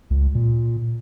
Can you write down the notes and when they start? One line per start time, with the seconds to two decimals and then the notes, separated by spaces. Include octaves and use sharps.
0.10 C#2
0.35 A#2